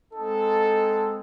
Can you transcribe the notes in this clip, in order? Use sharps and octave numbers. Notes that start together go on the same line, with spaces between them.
G#3 C4 D#4 A4